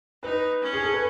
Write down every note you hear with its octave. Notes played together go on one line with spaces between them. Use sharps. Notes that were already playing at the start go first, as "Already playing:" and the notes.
D#4 B4
C#4
G#4
A4
B4